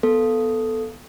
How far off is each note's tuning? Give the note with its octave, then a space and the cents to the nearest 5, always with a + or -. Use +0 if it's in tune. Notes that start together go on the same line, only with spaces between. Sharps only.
B3 +0 A4 +0